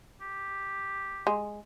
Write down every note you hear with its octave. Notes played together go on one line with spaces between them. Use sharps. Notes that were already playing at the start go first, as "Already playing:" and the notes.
G4
G#3